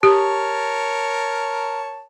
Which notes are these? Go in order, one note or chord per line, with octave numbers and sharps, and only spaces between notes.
G4 A#4 C#5 A5